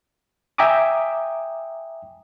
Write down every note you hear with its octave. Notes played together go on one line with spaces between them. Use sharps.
E5 G5 G#5 A#5 D6 D#6